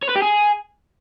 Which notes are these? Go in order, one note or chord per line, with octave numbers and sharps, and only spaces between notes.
C#5
B4
G4
G#4